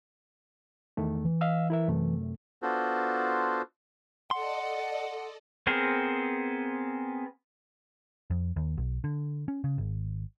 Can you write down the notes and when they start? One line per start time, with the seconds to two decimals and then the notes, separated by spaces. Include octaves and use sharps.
0.97 E2 D#3 A3
1.25 E3
1.41 D#5 F5 E6
1.70 E4 A#4 E5
1.88 F#2 C3 A3
2.62 B3 D4 F4 F#4 A4 C5
4.31 A4 D5 D#5 F#5 C6
5.67 B3 C4 G#4 A#4 C5
8.30 F2
8.56 D#2
8.77 B1
9.04 D3
9.48 C#4
9.64 C#3
9.78 G#1